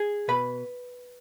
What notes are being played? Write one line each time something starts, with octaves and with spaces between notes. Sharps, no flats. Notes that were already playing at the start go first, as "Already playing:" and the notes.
Already playing: G#4 G#5
B2 B4 B5